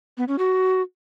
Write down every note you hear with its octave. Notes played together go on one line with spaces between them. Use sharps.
B3
C#4
F#4